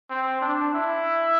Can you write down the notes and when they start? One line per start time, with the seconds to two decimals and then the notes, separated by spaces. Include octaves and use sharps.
0.10 C4
0.41 D4
0.74 E4